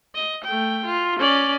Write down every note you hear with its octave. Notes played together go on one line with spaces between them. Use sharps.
D#5
A3 G5
F4
C#4 D5